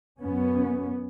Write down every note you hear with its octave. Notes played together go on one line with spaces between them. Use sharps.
F#2 B3 C#4